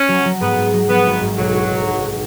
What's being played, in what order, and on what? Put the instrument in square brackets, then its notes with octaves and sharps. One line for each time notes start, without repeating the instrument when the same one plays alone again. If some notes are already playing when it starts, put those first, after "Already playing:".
Already playing: [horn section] C#4
[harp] F#3
F#3
[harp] G#2 [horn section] B3
[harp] G#2
F#3
[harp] F#3 [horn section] B3
[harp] G#1
G#2
[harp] B1 [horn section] F#3
[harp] E4
B1
B2
B2